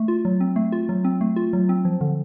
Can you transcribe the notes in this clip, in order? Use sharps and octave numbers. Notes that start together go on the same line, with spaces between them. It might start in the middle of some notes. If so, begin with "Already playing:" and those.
Already playing: A3
F4
F#3
C4
A3
F4
F#3
C4
A3
F4
F#3
C4
F3
D3